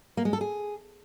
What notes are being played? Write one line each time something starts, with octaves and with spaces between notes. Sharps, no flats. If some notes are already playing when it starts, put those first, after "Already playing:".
A#3
G#3
A4
G#4